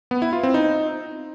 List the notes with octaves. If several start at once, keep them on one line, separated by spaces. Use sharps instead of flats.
B3
E4
F4
C4
D#4